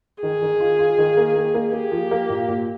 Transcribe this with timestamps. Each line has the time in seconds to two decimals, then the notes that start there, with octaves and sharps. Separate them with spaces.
0.23 D#3 G#4
0.42 D#3
0.60 F4
0.79 F4
0.98 D#3
1.17 A#3
1.36 A#3
1.54 A#3
1.73 A#3 G4
1.92 F3
2.11 A#3
2.30 A#2
2.48 A#2